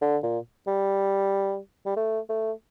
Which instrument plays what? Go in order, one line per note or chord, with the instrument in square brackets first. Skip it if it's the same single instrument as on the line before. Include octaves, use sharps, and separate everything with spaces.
[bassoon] D3
A#2
G3
G3
A3
A3